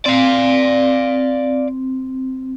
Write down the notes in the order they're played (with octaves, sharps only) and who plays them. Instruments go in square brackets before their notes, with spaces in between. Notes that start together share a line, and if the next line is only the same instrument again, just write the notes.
[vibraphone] C4 [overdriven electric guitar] D5 F5